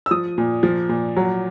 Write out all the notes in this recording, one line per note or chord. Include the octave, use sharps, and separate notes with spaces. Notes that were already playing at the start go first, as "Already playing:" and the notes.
E6
F3 D#6
A#2
F3
A#2
F#3